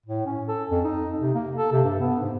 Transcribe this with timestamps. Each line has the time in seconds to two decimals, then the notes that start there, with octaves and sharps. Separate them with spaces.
0.06 A2
0.26 C#4
0.48 A4
0.71 F2
0.84 D#4
1.21 C3
1.35 A#3
1.57 A4
1.72 C3
1.84 G2
2.00 B3
2.20 G#2